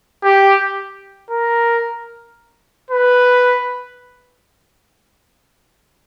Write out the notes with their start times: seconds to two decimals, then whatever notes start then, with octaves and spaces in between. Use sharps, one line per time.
0.23 G4
1.30 A#4
2.90 B4